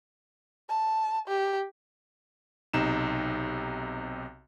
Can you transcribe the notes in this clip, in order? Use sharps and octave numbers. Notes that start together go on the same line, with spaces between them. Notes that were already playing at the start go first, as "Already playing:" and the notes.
A5
G4
B1 C3 D#4 E7